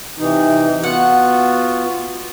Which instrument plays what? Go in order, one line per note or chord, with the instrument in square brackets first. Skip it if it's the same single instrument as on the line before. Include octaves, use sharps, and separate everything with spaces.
[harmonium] C3 E3 D#4
[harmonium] B3 F4 F#4 [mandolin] F#5